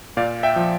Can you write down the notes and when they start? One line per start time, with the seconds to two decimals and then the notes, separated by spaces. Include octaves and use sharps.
0.17 A#2 D5 F5
0.43 E5 G5
0.56 F3